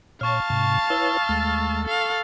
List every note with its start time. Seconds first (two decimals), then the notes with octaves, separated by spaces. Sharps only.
0.21 A#2 C#5 F5 A5 C#6 F6
0.50 G#2 C3
0.90 E4 B4 C#5 E6 A6
1.29 D#2 G#3 A3 A6
1.85 A4 F5